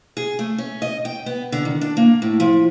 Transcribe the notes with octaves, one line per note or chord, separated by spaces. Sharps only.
G#4
A3
C#4
D#5
G5
B3
D3
D#3
D4
A#3
A2
F3